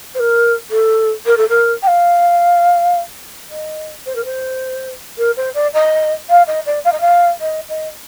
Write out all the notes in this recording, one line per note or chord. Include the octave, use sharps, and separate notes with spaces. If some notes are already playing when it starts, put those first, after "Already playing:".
C5
A#4
A4
A#4
A4
A#4
G5
F5
D#5
C5
A#4
C5
A#4
C5
D5
D#5
F5
D#5
D5
F5
D#5
F5
D#5
D#5